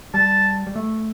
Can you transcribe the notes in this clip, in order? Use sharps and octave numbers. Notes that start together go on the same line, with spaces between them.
G3 A5
G3
A3